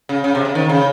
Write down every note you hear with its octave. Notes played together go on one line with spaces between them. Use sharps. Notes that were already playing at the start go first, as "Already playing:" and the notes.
C#3
C#3
C3
C#3
D#3
C#3